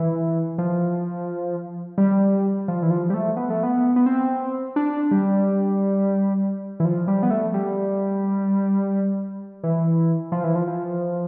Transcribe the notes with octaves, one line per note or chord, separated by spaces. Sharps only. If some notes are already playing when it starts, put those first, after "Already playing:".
Already playing: E3
F3
G3
F3
E3
F3
G3
A3
B3
A3
B3
B3
C4
D4
G3
E3
F3
G3
B3
A3
G3
E3
F3
E3
F3
F3